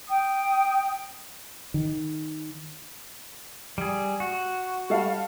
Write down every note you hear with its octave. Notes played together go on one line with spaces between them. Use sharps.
G5 D#6
D#3
G3 G#4
F#4
G3 A4 F5